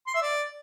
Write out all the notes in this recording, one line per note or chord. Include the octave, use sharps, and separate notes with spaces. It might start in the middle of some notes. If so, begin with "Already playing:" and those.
C6
E5
D5